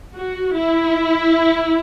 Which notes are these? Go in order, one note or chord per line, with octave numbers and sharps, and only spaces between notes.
F#4
E4